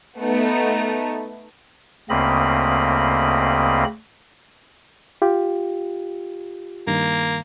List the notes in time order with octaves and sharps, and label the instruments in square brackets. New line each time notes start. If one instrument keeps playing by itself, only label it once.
[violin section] A3 B3 D#4
[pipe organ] D2 C#3 A#3 C4 D#5 B5
[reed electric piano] F4 G4
[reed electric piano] G2 D#3 [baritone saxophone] A#3